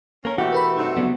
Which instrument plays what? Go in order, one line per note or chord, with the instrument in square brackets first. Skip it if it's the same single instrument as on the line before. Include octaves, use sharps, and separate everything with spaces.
[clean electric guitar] A#3 A#4 [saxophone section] C#4
[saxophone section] B2 E3 A3 [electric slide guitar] F#4 [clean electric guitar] G4
[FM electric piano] A#4 B4 B5
[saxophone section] G2 C3 A3 [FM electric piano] D#4
[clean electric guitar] C#3 F#3 G3 [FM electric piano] B3